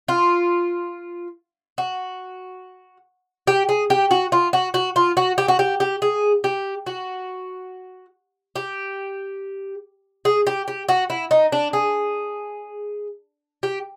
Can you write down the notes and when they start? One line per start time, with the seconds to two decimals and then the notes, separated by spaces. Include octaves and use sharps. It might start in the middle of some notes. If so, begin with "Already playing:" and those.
0.08 F4
1.78 F#4
3.47 G4
3.69 G#4
3.90 G4
4.11 F#4
4.32 F4
4.53 F#4
4.74 F#4
4.96 F4
5.17 F#4
5.38 G4
5.48 F#4
5.59 G4
5.80 G4
6.02 G#4
6.44 G4
6.86 F#4
8.56 G4
10.25 G#4
10.47 G4
10.68 G4
10.89 F#4
11.10 E4
11.31 D#4
11.52 D4
11.73 G#4
13.63 G4